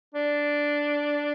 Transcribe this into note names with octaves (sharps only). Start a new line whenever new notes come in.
D4